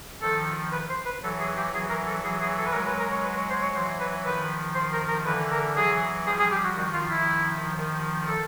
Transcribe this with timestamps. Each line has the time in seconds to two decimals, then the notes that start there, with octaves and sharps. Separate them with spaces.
0.22 D#3 F3 A4
0.72 B4
0.89 C5
1.06 B4
1.22 E3 F#3 A4
1.40 G#4
1.57 G4
1.73 E3 F#3 G#4
1.90 A#4
2.06 A4
2.23 E3 F#3 G#4
2.41 G#4
2.58 A4
2.66 B4
2.73 F#3 G#3 A#4
2.87 B4
2.99 A#4
3.12 C#5
3.24 B4
3.36 C#5
3.50 C5
3.62 C#5
3.74 E3 F#3 C5
4.00 B4
4.25 D#3 F3 B4
4.75 C5
4.93 A#4
5.08 A#4
5.25 D3 E3 B4
5.51 A#4
5.76 E3 F#3 G#4
6.26 F3 G3 G#4
6.39 G#4
6.52 G4
6.64 F#4
6.76 D#3 F3 F#4
6.93 F4
7.10 E4
7.77 D#3 F3
8.27 A4